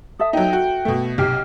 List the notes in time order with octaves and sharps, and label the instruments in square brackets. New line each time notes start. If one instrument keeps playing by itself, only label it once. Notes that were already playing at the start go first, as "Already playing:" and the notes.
[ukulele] A4 E5 [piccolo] D#6
[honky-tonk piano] F#3 D#4 [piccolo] G5
[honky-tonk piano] F#4
B2 A3
[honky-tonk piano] B1 C3 C7 [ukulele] G4 [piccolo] F6